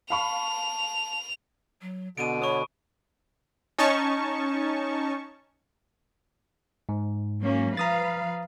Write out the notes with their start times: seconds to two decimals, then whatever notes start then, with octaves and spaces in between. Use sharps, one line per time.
0.10 F5 A5 B5 C#6 F7
1.82 F#3
2.17 B2 D3 B3 D7 D#7
2.42 C#5 B5 C#6 D#6
3.79 C#4 D#4 A5 C#6
6.89 G#2
7.41 F#3 A#3 C#4
7.77 F3 B4 F5 A#5 D#6 A6